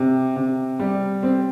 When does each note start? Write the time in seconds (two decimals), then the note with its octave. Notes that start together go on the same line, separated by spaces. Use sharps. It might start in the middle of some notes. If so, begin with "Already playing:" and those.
Already playing: C3
0.36 C3
0.79 G3
1.23 C4